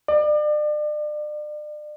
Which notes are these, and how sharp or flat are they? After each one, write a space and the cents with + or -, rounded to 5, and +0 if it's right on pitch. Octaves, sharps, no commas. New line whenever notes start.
D5 +35